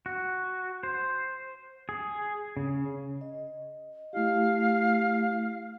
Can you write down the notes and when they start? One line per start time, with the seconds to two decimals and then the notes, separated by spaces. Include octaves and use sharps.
0.06 F#4
0.83 C5
1.89 G#4
2.57 C#3
3.21 D#5
4.13 A3 E4 G4 F5